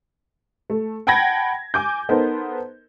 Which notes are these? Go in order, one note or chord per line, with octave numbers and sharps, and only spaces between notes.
A3
F#5 G5 A5 B5 G#6 A#6
G#5 D6 G6
B3 D#4 A4 A#4 C5